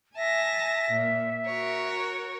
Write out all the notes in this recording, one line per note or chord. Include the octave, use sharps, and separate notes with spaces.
E5 G#5 A5 A#6
A#2
F#4 A#4 C#5